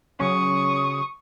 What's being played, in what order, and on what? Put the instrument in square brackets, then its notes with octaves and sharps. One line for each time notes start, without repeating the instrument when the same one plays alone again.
[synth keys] C#3 F#3 C#4 [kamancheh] C#6 D#6